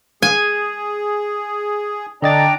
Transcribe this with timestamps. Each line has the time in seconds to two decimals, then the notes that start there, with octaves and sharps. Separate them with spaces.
0.22 G#4 G#5
2.22 D3 D4 D5 D#5 G5 A#5 A6